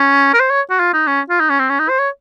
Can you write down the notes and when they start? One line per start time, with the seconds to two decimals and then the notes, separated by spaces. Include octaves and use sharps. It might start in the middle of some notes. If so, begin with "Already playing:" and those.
Already playing: C#4
0.34 A#4
0.40 C5
0.50 C#5
0.70 F#4
0.80 F4
0.93 D#4
1.07 C#4
1.30 F4
1.40 D#4
1.50 C#4
1.59 C4
1.70 C#4
1.79 D#4
1.89 C5
1.99 C#5